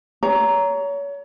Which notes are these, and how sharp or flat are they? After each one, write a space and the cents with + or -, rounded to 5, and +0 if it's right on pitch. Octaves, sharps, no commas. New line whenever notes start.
C#5 +30 A#5 +0